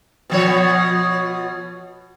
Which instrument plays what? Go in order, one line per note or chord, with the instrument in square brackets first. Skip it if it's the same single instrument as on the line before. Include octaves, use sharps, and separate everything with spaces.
[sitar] B2 F3 C#5